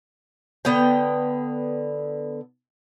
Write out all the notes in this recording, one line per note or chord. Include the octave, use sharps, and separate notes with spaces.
D3 B3 F#5 G5